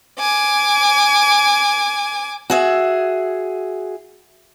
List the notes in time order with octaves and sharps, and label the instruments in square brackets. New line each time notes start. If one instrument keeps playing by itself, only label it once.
[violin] G#5 D6
[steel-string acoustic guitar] F#4 G#4 E5